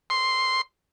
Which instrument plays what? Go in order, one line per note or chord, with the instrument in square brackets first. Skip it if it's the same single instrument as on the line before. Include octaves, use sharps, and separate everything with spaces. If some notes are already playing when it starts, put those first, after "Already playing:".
[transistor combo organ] C6